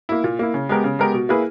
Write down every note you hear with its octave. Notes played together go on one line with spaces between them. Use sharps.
A#3 E4
A#2
A#3 E4
C#3
G#3 B3 G4 A#4
C#3
G#3 B3 G4 A#4
B2
A#3 E4 G#4 B4